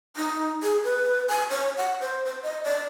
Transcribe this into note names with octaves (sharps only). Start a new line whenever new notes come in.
D#4
G#4
B4
G#5
C#5
F#5
C5
C5
D#5
D5